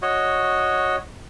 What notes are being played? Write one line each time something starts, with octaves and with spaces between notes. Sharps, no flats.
F#4 C#5 D#5